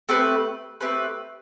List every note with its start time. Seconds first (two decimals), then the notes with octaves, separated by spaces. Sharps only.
0.09 A3 C4 G4 B4
0.81 A3 C4 G4 B4